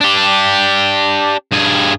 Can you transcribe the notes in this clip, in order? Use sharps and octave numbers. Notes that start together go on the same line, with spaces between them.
D4 G4
G2 G#4